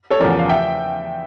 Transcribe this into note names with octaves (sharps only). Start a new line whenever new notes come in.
A4 C#5
E2 C#3 F3 A#4 D5
F5
E5 G5